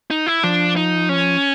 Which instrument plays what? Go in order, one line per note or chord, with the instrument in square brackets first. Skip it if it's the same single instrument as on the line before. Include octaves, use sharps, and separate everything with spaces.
[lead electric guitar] D#4
E4
[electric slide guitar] F3 [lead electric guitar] D4
[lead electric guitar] D#4
C#4